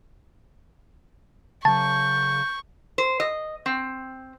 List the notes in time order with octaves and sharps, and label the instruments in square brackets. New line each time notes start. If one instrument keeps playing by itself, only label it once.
[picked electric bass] C#3 F#3 [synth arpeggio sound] A5 [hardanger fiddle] C#6 [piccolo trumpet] G6
[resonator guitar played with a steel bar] C5
D#5
C4